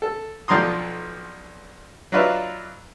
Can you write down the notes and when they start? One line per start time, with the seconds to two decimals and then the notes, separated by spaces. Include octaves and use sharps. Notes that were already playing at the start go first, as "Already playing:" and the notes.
0.02 A4
0.48 B1 F3 D4 A#5 C6 D#6
2.12 F#3 D4 D#4 F4 B4 E5